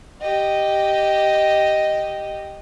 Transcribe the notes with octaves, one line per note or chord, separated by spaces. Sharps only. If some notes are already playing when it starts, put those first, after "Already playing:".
G4 D#5